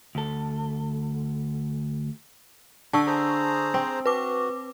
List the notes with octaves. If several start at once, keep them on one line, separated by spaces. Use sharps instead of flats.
D2 A4
D3 A5 C#6 E6
G#4 C5 A#5
C4
F#4 B4 D6